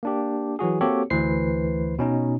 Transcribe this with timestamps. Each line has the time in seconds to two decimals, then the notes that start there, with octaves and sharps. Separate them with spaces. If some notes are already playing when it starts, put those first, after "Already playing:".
0.03 A#3 D4 G4
0.59 E3 F#3 F#4 G#4
0.81 A#3 C4 F#4 G4 A4 C#5
1.10 D2 E3 B4 C5 C7
1.99 B2 C#4 D#4